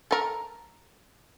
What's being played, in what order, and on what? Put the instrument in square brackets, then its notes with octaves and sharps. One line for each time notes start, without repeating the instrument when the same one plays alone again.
[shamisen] A4 A#4